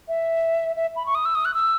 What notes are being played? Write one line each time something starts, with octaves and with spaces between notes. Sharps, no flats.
E5
E5
B5
C#6
D#6
E6
D#6
F#6
E6